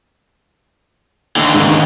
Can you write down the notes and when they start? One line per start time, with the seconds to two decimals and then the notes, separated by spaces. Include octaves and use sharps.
1.37 D#2 D3
1.54 C#2 G#2 D#3